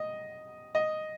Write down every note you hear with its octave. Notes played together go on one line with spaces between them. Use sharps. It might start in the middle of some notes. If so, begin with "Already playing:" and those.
Already playing: D#5
D#5